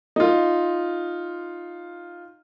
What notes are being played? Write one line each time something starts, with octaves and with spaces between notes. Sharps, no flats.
D#4 F4